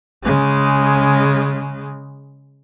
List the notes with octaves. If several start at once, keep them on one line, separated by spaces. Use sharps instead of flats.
C#3 G#3